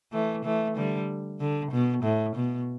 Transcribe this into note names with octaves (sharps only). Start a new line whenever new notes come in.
E3 A3
E3 A3
D3 G3
D3
B2
A2
B2